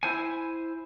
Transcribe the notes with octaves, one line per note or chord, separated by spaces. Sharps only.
E4 C5 G#5